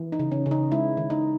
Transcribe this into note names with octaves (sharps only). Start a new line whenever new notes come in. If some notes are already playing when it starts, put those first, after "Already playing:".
Already playing: E3
D#4
C#3
C#4
C#3
D#4
G#3 E4
D#3
D#4